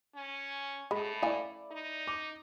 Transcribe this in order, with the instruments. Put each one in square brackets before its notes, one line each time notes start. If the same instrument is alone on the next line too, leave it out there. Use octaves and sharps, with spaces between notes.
[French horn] C#4
[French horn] A2 [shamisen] G#3 [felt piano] B5
[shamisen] A3 F5 G#5 [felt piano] E4 D5
[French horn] D#4
[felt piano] D6